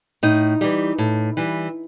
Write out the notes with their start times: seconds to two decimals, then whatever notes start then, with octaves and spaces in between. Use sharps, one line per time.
0.23 A2 D#4
0.61 E3 G3
0.98 A2
1.37 E3 G3